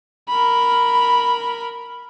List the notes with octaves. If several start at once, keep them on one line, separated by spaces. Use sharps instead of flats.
A#4 B5